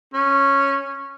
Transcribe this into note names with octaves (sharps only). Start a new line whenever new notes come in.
C#4